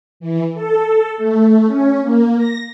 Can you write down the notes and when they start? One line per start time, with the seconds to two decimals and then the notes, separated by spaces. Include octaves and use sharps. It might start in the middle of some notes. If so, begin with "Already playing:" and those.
0.20 E3
0.54 A4
1.18 A3
1.67 C#4
2.02 A#3
2.37 A#6